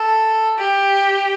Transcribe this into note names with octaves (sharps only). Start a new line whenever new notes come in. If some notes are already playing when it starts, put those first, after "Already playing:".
Already playing: A4
G4